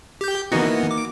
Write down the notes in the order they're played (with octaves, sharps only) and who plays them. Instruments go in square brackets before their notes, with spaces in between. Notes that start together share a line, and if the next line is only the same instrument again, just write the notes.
[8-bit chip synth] G4 G6
[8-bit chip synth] E3 B3 [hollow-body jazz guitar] A#3 D#4 F#4
[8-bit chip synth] D6